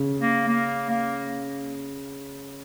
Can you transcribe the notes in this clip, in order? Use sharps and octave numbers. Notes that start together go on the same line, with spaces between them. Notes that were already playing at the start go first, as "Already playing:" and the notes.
Already playing: C#3
A#3
A#3
A#3